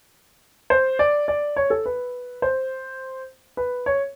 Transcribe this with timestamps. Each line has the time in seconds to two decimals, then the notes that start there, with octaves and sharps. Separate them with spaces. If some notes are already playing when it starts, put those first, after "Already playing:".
0.70 C5
0.99 D5
1.28 D5
1.56 C#5
1.70 A4
1.86 B4
2.42 C5
3.57 B4
3.86 C#5